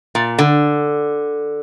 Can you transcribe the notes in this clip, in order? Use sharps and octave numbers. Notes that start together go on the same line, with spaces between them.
A#2
D3